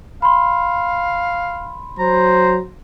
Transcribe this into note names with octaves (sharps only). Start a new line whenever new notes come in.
F5 B5 C6
F#3 C5 A#5